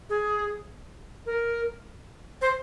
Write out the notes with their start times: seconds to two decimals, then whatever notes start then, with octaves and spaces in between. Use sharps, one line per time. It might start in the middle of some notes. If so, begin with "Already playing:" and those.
0.10 G#4
1.26 A#4
2.41 C5